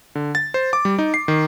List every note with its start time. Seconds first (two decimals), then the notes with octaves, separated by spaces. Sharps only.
0.15 D3
0.35 A6
0.54 C5
0.73 D6
0.85 G3
0.99 D#4
1.14 C7
1.28 D#3